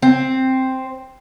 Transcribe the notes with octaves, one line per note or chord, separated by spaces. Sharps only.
C4